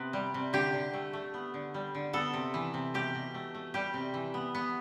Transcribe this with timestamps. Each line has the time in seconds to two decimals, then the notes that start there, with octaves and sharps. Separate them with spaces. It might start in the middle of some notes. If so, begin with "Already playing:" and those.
Already playing: C3 B3 B4
0.13 G3
0.34 C3
0.53 D3 G4
0.74 D3
0.93 A3
1.13 A3
1.34 B3
1.54 D3
1.74 G3
1.95 D3
2.13 B3 A4
2.33 C3
2.54 E3
2.74 C3
2.94 B2 G4
3.15 B2
3.34 A3
3.55 A3
3.74 G3 G4
3.94 C3
4.14 E3
4.34 B3
4.55 B3